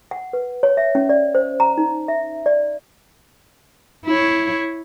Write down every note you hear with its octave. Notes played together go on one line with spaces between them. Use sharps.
F#5
B4
C#5
E5
C#4
D5
C5
A#5
D#4
E5
D5
E4 C#5